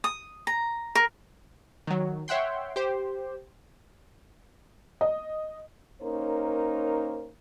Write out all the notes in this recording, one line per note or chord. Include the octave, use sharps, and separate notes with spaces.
D#6
A#5
A#4
D#3 F#3
C#5 E5 F#5 G5 C6
G4 C5
D#5
A#3 C#4 D#4 A#4 C5 C#5